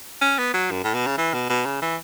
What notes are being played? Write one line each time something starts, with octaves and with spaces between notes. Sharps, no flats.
C#4
B3
F#3
F#2
A2
B2
C#3
E3
B2
B2
C#3
E3